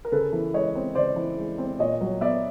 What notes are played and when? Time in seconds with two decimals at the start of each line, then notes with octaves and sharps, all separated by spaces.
0.05 A#4
0.12 C#3 A4 B4
0.33 E3
0.53 G#3 C#5 D#5
0.75 C4
0.95 C#3 C5 D5
1.16 E3
1.38 G#3
1.58 C4
1.79 A#2 C#5 D#5
2.01 F#3
2.21 B3 D5 E5